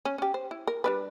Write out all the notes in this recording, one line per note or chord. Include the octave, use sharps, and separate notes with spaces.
C#4
C#4 G4
C5
E4
A#4
G3 D4 B4